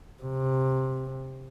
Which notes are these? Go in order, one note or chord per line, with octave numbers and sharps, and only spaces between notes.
C3